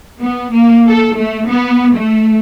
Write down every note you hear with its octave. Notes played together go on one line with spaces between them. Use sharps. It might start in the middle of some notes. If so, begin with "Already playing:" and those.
B3
A#3
A4
A3
B3
A3